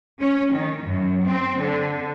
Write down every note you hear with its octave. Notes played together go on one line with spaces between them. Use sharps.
C#4
D#3
F#2
C4
D3